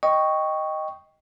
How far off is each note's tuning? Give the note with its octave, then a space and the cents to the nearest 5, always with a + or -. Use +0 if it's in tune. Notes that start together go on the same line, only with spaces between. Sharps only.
D#5 +0 G5 +0 C#6 +0